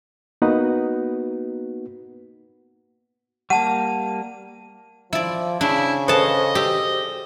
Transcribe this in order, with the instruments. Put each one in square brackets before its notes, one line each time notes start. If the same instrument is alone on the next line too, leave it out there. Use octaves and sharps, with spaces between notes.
[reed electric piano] A#3 B3 D#4 F#4 B4 F#5
[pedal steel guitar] G3 A#3 [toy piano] F#5 [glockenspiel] A5 D#7
[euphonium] F3 [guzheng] E4 D5
[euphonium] C#3 [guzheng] D4 [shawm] E4
[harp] G#4 A4 C5 [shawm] D#5 [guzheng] F#5 A5
[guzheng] G4 [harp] D5 E6 A#6